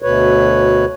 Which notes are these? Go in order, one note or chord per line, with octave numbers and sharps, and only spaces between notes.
D2 B2 B4 C#5